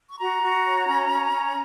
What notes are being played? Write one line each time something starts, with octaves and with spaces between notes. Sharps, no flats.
C#6
F#4 A#5
F#4
C#5
C#4
C#4
C#4